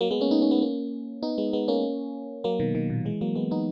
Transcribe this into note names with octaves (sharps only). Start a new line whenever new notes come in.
F#3 A#3
G#3 B3
A#3 C#4
B3 D#4
A#3 C#4
G#3 B3
A#3 C#4
B3 D#4
G#3 B3
G#3 B3
A#3 C#4
F#3 A#3
B2 D#3
B2 D#3
A#2
E3 G#3
F#3 A#3
G#3 B3
B3 D#4